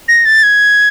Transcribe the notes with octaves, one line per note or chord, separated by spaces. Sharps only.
A#6
A6
G#6